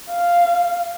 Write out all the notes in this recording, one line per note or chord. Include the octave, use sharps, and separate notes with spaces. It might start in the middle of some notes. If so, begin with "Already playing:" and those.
F5